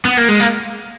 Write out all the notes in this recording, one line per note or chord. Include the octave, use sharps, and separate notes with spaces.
B3
A#3
G#3
A#3